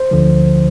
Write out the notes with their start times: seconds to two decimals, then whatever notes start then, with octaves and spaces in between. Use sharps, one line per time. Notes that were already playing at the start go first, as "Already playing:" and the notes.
Already playing: C5
0.11 D2 D3 F3